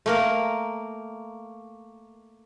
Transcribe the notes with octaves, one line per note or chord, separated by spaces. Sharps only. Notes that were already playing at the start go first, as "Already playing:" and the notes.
A3 A#3 A#4